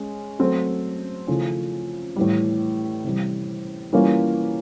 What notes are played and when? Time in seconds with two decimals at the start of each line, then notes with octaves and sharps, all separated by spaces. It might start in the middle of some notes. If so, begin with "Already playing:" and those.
Already playing: G#3 C#4
0.39 F#3 A3 C4
1.27 C#3 F3 A3 C#4 E4
2.16 A2 E3 G3
3.04 C3 E3 G3
3.93 E3 G3 A#3 C#4 F4